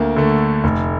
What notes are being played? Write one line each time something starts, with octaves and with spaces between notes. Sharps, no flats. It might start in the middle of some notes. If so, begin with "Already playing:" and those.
Already playing: D2 A#3
D3 A3
F1